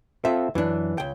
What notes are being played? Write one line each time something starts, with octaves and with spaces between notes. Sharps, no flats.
C4 F4 A4 E5
F#2 E3 D4
C#2 G5